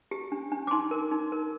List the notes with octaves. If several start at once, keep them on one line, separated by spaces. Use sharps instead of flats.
G4
D4
D4
D6
D#4 C6
A#4
D#4
A#4